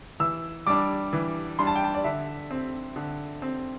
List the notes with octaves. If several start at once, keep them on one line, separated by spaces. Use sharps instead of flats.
E3 E6
G3 D4 D6
E3
G3 D4 C6
A5
G5
A5
D5
D3 E5
C4
D3
C4